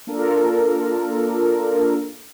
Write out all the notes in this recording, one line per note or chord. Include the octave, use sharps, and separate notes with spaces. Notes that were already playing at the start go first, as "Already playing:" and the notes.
A#3 D4 F4 A4 A#4